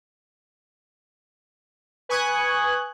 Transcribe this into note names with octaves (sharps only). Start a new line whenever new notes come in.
B4 G#5 C#6 D#6 F#6 G#6